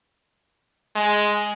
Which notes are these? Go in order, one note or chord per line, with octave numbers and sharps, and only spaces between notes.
G#3